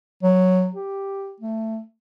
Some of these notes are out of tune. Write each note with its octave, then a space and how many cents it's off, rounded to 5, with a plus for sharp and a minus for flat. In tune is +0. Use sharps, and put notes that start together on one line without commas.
F#3 -5
G4 +0
A3 +15